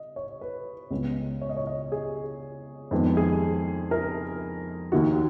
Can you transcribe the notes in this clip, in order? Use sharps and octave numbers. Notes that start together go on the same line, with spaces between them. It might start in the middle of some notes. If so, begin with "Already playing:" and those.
Already playing: D#5
C#5
B4
C#2 C#3 G#3 B3
C#5
D#5
C#5
D#5
G#4
F2 D#3 G#3 B3
G#4
A#4
D#2 D#3 A#3 F#4